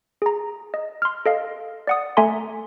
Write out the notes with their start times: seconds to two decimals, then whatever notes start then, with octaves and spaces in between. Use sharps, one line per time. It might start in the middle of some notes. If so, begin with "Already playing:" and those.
0.22 G#4 A#5
0.74 D#5
1.02 C6 F6
1.26 A4 D#5 F5
1.87 D5 F#5 D#6
2.17 A3 A4 E5 G#5 A#5 C6